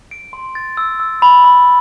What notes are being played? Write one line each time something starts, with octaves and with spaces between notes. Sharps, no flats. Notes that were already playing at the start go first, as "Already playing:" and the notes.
D7
C6
A6
E6
E6
B5
B5